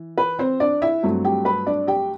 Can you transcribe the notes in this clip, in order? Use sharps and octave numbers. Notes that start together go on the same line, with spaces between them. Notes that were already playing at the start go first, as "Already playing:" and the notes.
Already playing: E3
B4
C4 C5
D4 D5
E4 E5
G2 F#3 A3 C4
G4 G5
B4 B5
D4 D5
G4 G5